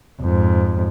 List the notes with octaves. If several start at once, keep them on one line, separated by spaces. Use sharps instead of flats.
F2 G#2